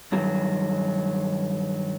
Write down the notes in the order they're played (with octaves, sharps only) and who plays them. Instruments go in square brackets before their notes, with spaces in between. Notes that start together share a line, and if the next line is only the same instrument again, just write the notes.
[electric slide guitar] G2 D#3 F#3